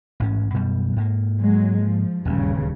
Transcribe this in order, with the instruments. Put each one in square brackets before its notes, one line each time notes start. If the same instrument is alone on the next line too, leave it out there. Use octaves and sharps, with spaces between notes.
[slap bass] A1 G#2 C#4
F#2 B2 G3
G#2 A#3
[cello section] F#3 G#3
F3
[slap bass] D#1 D2 [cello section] G2 C#3